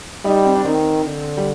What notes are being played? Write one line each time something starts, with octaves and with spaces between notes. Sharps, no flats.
G3 D#4
C4
D4
D#3 C4
D3
G3